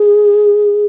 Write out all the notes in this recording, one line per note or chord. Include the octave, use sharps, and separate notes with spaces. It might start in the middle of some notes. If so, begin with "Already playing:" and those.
Already playing: G#4